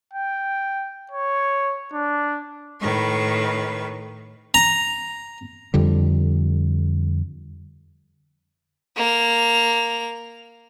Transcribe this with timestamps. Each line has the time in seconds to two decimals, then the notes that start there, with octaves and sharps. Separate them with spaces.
0.13 G5
1.11 C#5
1.93 D4
2.81 A2 D#3 B4 C#6
4.54 A#5
5.74 F2 D3 G3
8.97 A#3 F7